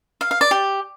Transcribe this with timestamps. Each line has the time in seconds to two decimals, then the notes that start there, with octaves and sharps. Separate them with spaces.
0.21 F5
0.31 F5
0.41 D5
0.51 G4